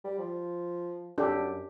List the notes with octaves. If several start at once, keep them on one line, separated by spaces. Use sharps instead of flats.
G3
F3
F#2 D4 G4 A4